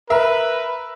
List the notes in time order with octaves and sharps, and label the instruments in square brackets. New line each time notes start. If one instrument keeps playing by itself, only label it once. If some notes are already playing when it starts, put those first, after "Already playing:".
[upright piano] A#4 E5 [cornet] B4